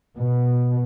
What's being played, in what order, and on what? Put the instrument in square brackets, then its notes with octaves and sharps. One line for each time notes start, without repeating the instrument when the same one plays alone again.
[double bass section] B2